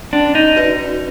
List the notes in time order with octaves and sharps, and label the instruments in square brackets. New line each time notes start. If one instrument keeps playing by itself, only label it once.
[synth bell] C#4 [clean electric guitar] D4
[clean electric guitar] D#4
[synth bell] F#4 B4 D5